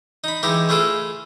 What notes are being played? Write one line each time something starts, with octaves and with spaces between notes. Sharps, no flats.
D#4 B5
E3 G#3 D#4 E4 G4
A3 E4 F4 G#4 A4